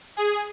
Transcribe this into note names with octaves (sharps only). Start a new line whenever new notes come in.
G#4